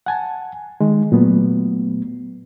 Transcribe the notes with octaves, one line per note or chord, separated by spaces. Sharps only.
F#5 G#5 A5
D#3 G#3
A#2 F#3 A3 B3